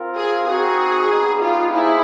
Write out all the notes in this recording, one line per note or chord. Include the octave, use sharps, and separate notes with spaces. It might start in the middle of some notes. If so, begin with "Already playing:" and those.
Already playing: C4 F4 A#4
G#4
C4 D#4 F#4 G#4
G3 B3 D#4
F4
A#3 D#4 E4 G#4 C5 E5